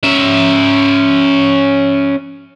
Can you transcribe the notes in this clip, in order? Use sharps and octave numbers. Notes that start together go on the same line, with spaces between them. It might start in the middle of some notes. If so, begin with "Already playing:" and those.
C#4 E5